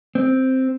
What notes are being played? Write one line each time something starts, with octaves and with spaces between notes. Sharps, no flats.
C4